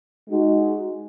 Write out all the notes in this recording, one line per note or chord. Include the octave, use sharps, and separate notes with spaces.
G#3 D#4 F#4